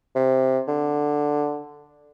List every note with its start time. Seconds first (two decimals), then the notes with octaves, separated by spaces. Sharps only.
0.15 C3
0.68 D3